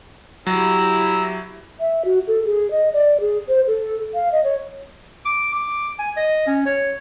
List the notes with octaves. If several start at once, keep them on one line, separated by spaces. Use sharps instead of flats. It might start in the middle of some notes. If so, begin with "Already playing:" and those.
F#3 E4 G4 A#5 E6
E5
F#4
A4
G#4
D#5
D5
G#4
C5
A4
F5
D#5
C#5
D6
D6
G#5
D#5
C#4
C#5